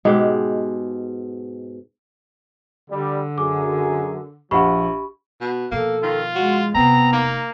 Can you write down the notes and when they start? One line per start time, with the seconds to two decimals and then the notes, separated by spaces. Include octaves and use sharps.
0.05 G#2 B2 G#3 G4
2.90 D3 G3
3.38 F#2 G#4 D6
4.51 A#1 F3 G4 F#5 B5 C#6
5.41 B2
5.72 B2 F3 A#3 A4
6.03 D#3 F4
6.35 G#3 F#4
6.75 E1 C3 B3 C4 A#5
7.12 A#3 D#4